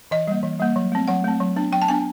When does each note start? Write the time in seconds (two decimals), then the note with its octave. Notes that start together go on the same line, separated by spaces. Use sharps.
0.11 E3 D#5
0.27 G3 A#3
0.43 E3
0.60 G3 A#3
0.76 F#3
0.92 A3 C4
1.08 F#3 F#5
1.24 A3 C4
1.40 F#3
1.56 B3 D4
1.72 F#3 G5
1.82 A5
1.88 B3 D4 G#5